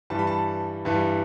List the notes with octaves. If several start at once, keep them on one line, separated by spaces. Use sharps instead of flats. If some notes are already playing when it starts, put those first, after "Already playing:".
G2 E3 G3 A5
B5
A5
G2 E3 G3